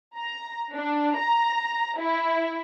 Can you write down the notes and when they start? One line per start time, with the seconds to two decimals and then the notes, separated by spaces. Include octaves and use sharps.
0.16 A#5
0.74 D4
1.18 A#5
2.00 E4